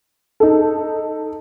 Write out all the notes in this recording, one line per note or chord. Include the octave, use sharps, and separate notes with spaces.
D#4 A4